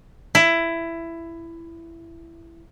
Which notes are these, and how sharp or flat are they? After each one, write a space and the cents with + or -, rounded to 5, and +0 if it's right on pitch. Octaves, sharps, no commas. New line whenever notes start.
E4 +15